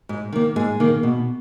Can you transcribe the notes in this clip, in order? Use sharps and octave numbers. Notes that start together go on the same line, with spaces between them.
G#2
D#3 A#3
G#2 G#4
D#3 A#3
B2